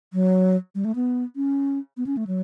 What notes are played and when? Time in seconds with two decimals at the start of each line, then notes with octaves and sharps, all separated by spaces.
0.13 F#3
0.75 G3
0.85 A3
0.95 B3
1.36 C#4
1.97 B3
2.07 C#4
2.17 A3
2.27 F#3